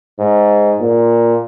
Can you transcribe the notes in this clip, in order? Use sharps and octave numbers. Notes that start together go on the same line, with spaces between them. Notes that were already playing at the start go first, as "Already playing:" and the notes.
G#2
A#2